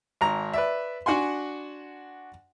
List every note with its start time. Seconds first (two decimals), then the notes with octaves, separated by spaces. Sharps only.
0.21 G#1 A#5
0.53 B4 D5 E5
1.06 D4 F#4 F#5 G#5 C6